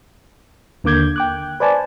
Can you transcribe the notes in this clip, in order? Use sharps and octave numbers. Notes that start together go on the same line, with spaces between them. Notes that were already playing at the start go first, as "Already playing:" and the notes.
D#2 D3 A#3 D6 G6 G#6
G5 D6 F#6
B4 C5 D5 G#5 A5